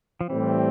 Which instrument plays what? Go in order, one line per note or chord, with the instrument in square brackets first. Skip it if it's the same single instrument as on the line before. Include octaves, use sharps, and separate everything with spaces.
[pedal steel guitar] F3
[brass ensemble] A2 G3 C4 [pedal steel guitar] E3